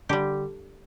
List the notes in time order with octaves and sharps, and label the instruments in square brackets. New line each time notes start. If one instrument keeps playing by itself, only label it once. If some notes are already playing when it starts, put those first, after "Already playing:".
[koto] D3 G3 G4